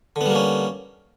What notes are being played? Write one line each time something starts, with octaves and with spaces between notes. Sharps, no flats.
D3 G3 A#3 B3 C#4